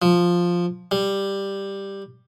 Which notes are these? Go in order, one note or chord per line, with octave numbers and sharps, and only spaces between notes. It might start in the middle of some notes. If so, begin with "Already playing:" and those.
F3
G3